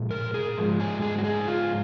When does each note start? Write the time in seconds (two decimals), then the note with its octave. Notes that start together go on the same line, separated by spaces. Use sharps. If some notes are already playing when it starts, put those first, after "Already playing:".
Already playing: A#2 F3 G#3
0.11 A#4
0.34 G#4
0.57 G#2 F3 G#3
0.80 G#4
1.02 G#4
1.18 F#4
1.25 G#4
1.47 F4